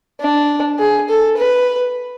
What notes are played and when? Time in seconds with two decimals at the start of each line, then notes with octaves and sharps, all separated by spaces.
0.20 D4
0.79 G#4
1.09 A4
1.37 B4